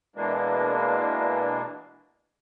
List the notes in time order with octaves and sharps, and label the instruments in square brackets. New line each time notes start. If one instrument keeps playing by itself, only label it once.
[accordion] B2 E3 G#3 A#3 D4